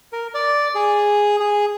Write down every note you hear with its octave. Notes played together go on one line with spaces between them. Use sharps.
A#4
D5
G#4
G#4